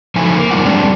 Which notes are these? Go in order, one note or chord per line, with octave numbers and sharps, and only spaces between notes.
F3 F#3 D#4 A4 E5 G#5
A#3
F#2 G3 D#4 F4 F#5
G3 G#3 C4 D4 G4